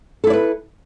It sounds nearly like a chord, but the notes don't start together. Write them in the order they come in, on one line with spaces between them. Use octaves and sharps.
A4 E4 D5 B4